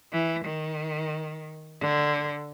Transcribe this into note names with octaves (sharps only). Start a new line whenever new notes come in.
E3
D#3
D3